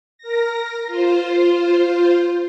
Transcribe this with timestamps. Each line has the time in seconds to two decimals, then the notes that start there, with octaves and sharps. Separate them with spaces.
0.18 A#4 A#6
0.87 F4 C5